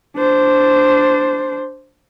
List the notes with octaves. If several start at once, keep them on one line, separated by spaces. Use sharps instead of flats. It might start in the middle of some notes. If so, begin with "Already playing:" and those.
D4 C5